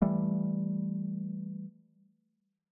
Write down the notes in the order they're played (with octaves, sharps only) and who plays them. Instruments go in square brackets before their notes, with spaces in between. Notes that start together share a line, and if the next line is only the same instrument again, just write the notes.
[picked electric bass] E3 G3 A3